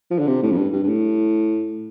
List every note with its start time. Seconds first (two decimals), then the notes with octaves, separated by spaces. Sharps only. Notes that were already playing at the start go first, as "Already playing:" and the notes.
0.11 F3
0.19 D3
0.27 C3
0.43 A2
0.51 F2
0.57 G2
0.73 G2
0.83 G2
0.88 A2